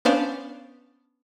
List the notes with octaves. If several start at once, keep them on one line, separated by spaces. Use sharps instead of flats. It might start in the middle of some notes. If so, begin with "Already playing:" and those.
B3 C#4 D4 C5 F5